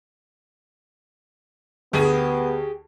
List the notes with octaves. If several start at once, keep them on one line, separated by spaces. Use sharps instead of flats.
D2 B3 G4 G#4